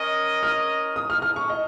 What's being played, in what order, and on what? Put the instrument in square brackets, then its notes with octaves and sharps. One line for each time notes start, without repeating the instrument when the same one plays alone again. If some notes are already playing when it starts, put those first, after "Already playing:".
Already playing: [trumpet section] C#4 A#4 D#5
[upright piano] F6
D#6
F6
F6
C#6
D#5